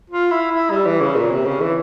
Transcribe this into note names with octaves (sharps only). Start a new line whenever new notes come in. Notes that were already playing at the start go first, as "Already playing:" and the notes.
F4
E4
E4
G3
E3
C#3
A#2
C3
C#3
E3